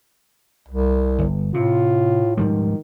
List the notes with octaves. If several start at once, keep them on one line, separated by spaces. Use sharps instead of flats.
C2
G1
A2 C3 F4
G#2 D#3 F3 G3